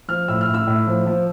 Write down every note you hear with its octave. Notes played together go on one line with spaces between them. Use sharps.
F3 F6
A2 E6
F6
A2
E6
A2
F3
F3